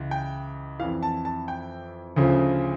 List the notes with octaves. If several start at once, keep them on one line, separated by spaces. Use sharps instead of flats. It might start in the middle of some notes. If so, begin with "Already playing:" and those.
Already playing: C#2 E3
G5
F2 E3 F5
A5
A5
G5
D2 C#3 F3